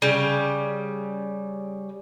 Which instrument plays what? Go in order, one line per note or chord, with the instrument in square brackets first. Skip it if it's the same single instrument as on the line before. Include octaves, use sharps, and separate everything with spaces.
[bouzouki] C#3 G3